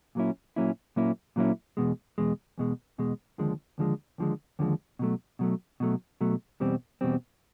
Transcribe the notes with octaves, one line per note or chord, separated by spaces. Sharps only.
A#2 F#3 A#3 C#4 E4
A#2 F#3 A#3 C#4 E4
A#2 F#3 A#3 C#4 E4
A#2 F#3 A#3 C#4 E4
E2 B2 G#3
E2 B2 G#3
E2 B2 G#3
E2 B2 G#3
D#2 D3 F3 G#3
D#2 D3 F3 G#3
D#2 D3 F3 G#3
D#2 D3 F3 G#3
B2 F#3 A3
B2 F#3 A3
B2 F#3 A3
B2 F#3 A3
E2 B2 G3 C4
E2 B2 G3 C4